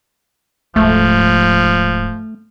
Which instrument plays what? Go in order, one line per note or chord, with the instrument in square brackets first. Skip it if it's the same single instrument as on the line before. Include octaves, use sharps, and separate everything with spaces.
[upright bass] D1 G#2 [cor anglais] F3 [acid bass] A3